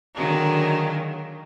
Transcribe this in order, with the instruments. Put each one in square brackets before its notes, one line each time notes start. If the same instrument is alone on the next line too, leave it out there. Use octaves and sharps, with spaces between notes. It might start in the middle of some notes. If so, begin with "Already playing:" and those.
[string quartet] D3 D#3 F#3 G#3 A#3